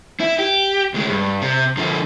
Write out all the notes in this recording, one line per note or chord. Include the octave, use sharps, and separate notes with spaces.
E4
G4
D2 G#3
G2
C3
D3 F3